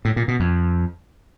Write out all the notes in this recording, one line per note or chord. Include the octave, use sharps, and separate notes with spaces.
A2
A#2
B2
F2